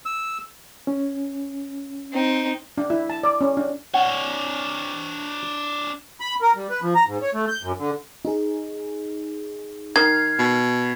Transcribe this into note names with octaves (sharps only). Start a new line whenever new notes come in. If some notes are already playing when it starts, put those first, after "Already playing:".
E6
C#4
C4 D#4
D4
E4
A5
D5
C#4
D4
D4 C#5 F#5
B5
A#4
G3
B4
F3
A#5
G#2
C#5
A3
G6
F#2
D3
D#4 G#4
D#3 F6 G#6 C7
B2